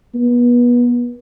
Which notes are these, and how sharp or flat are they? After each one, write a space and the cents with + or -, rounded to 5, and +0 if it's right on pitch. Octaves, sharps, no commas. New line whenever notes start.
B3 -30